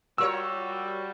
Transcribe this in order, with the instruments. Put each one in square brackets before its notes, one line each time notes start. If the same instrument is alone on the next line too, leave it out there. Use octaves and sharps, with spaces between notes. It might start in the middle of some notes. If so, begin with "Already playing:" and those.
[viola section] G3 F#4 [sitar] F4 A#4 C#5 [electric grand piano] E6